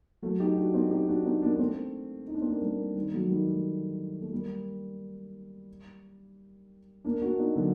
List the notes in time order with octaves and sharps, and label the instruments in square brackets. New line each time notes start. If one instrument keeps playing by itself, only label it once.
[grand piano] F#3 A3
D#4 G4
D4 F#4
C4 D#4
D#4 G4
D4 F#4
C4 D#4
A#3 D4
D4
A3 C4
D#4
D4
C4
A#3 D4
A3
G3 A#3
D#3 G3
F#3 A3
D#3 G3
F#3 A3
A3
G3 A#3
A#3 D4
D4 F#4
C4 D#4
D3 F#3